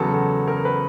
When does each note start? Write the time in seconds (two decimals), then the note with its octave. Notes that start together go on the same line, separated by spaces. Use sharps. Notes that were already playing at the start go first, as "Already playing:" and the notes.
Already playing: E2 C#3 F#3 B3 A4
0.14 A4
0.48 A#4
0.65 B4